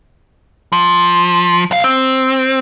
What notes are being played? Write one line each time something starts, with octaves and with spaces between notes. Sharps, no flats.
F3
B1 F5
C4